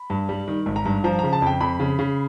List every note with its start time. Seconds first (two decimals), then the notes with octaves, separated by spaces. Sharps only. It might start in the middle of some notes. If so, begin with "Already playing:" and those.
Already playing: B5
0.10 G2
0.29 G3
0.48 D#3
0.66 G#1
0.76 A#5
0.85 G2
1.04 F3 A#5
1.19 C#3 A#5
1.33 A5
1.42 F2 G5
1.61 F2 B5
1.80 C#3
1.99 C#3